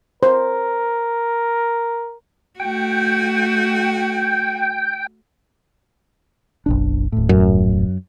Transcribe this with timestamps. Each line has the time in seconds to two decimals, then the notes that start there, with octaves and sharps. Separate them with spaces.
0.23 A#4 C5
2.60 A3 F#4 G5
6.66 F#1 B1 D4
7.12 D#1 A2
7.29 F#2